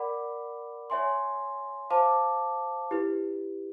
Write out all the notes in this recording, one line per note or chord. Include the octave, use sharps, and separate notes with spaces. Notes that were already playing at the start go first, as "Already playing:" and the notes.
Already playing: A#4 D5 F#5 B5 D6
C#5 E5 G#5 C6
C5 F5 A5 D6
E4 G4 B4